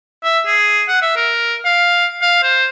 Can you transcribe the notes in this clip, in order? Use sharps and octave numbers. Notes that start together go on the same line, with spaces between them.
E5
G#4
F#5
E5
A#4
F5
F5
C5